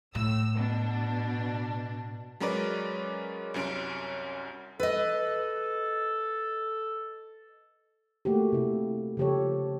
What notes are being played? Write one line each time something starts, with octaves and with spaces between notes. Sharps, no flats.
A2 E6
B2 D4
F#3 G#3 C#4 A#4 B4 D5
C2 F#2 C#4 D7
A4 B4 D#5
A3 A#3 F#4 G4
C3 E4
C#3 F3 G4 A4 C#5